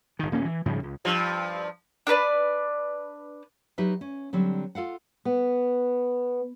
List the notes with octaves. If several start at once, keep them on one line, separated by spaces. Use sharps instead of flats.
G1 D#3
D#1 A#3 C#4
E3
G#2 C#3 F3 G3
C#2
G2 F3
D4 A4 B4 D5
F#3 D#4 G4 B4 E5
C#4
D3 F#3 G3 C4
F4 A4 F5 F#5
B3